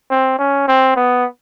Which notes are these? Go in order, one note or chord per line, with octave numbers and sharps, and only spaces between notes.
C4
C#4
C4
B3